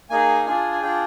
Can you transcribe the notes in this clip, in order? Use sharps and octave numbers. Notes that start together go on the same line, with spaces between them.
A#3 D#4 G#4 G#5
D4 F4 G#4 G#5
G#5
D4 F4 G#4 G5